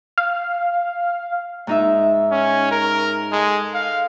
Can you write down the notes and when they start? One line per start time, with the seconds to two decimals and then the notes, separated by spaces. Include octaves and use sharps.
0.18 F5
1.67 G#2 D#4 E5
2.32 C#4
2.71 A#4
3.32 G#3 A4
3.74 F5